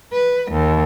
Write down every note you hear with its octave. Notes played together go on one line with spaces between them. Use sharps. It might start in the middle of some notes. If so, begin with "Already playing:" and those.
B4
D#2